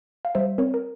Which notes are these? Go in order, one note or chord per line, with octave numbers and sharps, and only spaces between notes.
F5
G3 C5 E5
C4 A#4 C#5
A#4